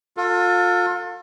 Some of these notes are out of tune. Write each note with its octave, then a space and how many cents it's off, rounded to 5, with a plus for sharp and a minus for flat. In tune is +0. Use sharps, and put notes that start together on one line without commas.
F4 +35 A4 +30